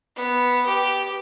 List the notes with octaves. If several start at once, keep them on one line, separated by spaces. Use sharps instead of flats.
B3
G4